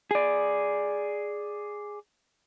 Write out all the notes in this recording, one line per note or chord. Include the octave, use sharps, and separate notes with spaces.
G#4 D5